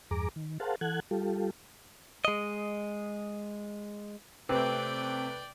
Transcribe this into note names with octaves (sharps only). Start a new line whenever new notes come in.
E2 G2 G#4 A#5 D6
D#3
G#4 A#4 C5 F5 F#5 A5
E3 A4 F#5 F#6 G#6
G3 F4 G4 A4
G#3 D#5
C3 A3 C4 B4 D5 G5